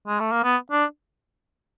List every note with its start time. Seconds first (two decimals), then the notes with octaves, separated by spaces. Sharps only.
0.07 G#3
0.20 A3
0.32 A#3
0.44 B3
0.72 D4